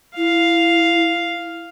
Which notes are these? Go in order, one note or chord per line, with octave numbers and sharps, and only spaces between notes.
E4 F5